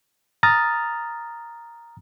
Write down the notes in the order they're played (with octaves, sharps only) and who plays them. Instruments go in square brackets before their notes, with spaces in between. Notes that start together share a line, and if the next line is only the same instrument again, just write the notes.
[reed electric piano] A#5 D#6 F6 A6